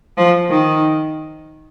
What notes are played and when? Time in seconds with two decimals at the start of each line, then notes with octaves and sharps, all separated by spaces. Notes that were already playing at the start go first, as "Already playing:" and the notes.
0.17 F3
0.50 D#3